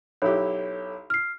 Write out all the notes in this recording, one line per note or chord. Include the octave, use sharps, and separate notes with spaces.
B1 E4 G4 A4 C#5
F6 C7